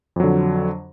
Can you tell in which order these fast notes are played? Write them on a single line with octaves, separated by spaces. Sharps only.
F2 F#3 D3